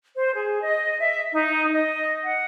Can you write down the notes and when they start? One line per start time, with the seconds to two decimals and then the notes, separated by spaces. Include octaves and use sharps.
0.16 C5
0.35 G#4
0.63 D#5
0.99 E5
1.32 D#4
1.73 D#5
2.24 F#5